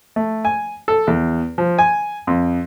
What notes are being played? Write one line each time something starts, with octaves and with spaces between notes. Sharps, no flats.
A3
G#5
A4
E2
F3
G#5
F2